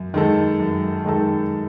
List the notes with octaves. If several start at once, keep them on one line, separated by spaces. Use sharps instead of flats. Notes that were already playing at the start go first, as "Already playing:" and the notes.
Already playing: F#2
D#3 G#3 D#4 A4
F#2
D#3 G#3 D#4 A4